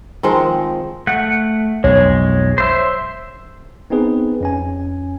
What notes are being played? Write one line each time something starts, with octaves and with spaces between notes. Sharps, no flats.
D#3 F3 G#3 C4
A3 F#5
B1 F2 G#3 C#5
C5 E5
B3 C4 D#4 G#4 B4
F2 C#4 G#5